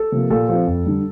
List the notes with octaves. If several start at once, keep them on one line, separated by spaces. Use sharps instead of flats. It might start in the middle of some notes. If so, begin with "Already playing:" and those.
Already playing: A4
C3 F3 A#3
A#2 A4
F3 C4
F2
D3 G3